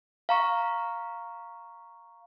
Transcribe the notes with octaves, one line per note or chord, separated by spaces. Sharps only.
F5 A#5 C#6